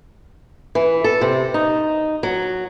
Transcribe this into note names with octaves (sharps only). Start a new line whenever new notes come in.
E3
A4
C3
D#4
F#3